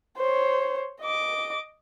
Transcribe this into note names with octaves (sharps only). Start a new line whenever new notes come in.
C5 C#5
D#5 D6